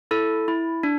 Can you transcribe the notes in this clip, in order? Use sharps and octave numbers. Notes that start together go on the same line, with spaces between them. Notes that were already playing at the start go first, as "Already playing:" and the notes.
E4 A4
E4
D4